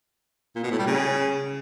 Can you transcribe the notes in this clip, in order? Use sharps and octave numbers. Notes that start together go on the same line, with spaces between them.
A#2
B2
A2
G3
C#3